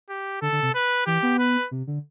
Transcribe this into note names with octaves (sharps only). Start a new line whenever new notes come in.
G4
D3 A4
D3
C3
B4
E3 G4
B3
B4
C3
D3